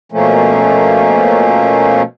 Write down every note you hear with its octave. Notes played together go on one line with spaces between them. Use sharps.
B2 F3 A3 A#3 C#4